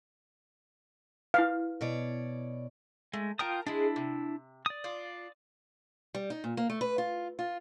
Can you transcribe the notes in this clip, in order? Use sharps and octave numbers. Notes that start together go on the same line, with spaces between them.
E4 B4 F5
B2 C#5 D5
G#3 A3
F4 A#4 G5 A5 A#5 D#6
G#3 D4 E4 G#4
C3
D5 D#6
D4 F4
G3
D#4
A#2
A#3
A3
B4
F4
F4